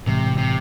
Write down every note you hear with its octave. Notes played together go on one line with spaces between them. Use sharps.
A2 C3 E3 G#3
C3